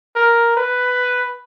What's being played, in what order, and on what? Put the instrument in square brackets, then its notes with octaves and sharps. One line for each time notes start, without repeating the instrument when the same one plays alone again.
[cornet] A#4
B4